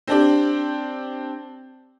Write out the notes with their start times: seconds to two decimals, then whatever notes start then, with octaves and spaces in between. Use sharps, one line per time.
0.07 C4 D4 G4